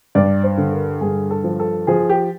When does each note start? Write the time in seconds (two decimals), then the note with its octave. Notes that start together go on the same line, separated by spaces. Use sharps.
0.15 G2 D5
0.43 C5
0.58 D3
0.72 A#4
1.01 G2 G#4
1.31 A4
1.44 F3
1.60 A4
1.87 F3 G#4
2.09 G4